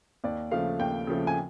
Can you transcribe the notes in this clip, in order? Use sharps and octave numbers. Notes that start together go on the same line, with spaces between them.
D#2 D5
C#3 F3 A3 F5
D#2 G5
C#3 F3 A3
G#5